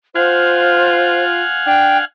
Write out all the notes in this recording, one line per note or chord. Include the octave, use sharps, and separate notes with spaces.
F4 C5 F5 F#5 G#5
D4 G5